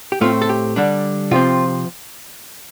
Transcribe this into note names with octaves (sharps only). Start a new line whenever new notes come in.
G4
A2 A3 C4 F4
A4
G4
D3 G3 D4
C3 F3 C4 F4